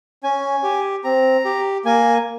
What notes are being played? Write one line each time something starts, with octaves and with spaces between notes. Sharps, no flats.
C#4 G#5
G4
C4 A#5
G4
A#3 G#5